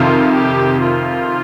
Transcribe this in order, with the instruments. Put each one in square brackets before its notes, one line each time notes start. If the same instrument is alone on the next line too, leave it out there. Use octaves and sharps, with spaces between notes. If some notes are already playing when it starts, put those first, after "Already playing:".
Already playing: [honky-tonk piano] F2 C3 D#3 [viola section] F4
[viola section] G4
F4